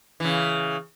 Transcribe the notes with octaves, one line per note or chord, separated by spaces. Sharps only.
C#3 E3